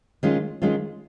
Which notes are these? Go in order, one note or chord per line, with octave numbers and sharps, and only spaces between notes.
D#3 G#3 C#4 F4
D#3 G#3 C#4 F4